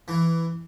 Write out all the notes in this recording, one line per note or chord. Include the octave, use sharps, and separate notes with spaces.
E3